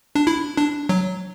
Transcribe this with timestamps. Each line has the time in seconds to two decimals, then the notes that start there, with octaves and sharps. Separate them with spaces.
0.15 D4
0.27 E4
0.57 D4
0.89 F#3